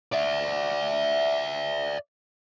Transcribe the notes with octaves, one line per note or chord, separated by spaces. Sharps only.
D5 E5